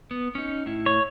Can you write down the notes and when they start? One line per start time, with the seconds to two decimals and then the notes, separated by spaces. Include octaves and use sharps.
0.11 B3
0.35 C#4 D#4
0.66 A2 E4
0.86 C#5